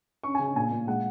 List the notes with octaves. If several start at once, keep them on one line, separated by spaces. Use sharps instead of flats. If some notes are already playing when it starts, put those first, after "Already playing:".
C#4 C#6
G#5
C#3
A#2 G#5
A#2
G#3 F#5